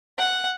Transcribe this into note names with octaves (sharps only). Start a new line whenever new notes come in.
F#5